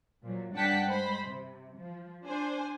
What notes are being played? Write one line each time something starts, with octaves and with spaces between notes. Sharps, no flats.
A#2 F3 F#3
G2 D4 F#5 G5 A5 B6
G#3 C5 B5
C3
F3
D4 C5 G#5